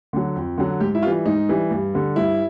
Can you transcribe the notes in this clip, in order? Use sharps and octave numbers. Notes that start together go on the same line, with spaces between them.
D3 F#3
F2
D3 F#3
G#2 G4
E4
E3 G3 F4
G#2 D#4
E3 G3
G2
D3 G3
G2 E4